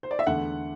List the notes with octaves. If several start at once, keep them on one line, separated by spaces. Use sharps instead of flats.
C5
D5
E5
E2 D3 A3 F#5